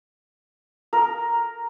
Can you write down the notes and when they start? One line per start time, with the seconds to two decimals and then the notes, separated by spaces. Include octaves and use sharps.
0.93 A#4